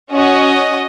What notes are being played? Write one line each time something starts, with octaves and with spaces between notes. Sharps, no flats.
C#4 F#4 D#5